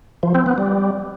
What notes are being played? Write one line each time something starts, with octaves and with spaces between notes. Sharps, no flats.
F3
C4
B3
G3